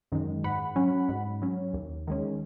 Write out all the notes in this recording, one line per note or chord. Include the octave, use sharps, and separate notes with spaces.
F#2 D#3 G#3
G#2 F#5 B5
F#3 C#4
G#2
F#3 C#4
D#2
D#3 G#3 C#4